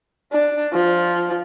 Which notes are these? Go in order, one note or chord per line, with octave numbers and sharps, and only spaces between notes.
D4
F3